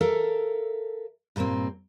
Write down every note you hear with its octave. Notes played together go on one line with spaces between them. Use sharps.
A4 A#4 E5 F5
G2 A#2 G#3 A#3 C4